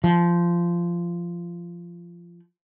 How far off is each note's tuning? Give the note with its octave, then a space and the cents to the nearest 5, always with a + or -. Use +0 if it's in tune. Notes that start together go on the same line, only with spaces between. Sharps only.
F3 -15